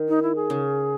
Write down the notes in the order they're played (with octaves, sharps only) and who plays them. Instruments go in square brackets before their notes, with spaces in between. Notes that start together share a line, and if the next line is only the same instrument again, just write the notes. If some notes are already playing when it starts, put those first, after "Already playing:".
Already playing: [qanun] D#3
[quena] D#4
E4
G#4
[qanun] C#3